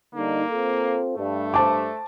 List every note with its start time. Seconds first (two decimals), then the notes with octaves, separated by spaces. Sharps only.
0.15 D3 G3 A#3 D#4
0.50 C4 F4 A4
1.17 G2 A3
1.54 C5 A5 D6